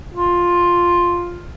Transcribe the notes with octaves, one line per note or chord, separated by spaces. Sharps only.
F4